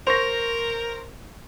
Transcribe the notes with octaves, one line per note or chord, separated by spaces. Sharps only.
A#4 C5 C#6 A#6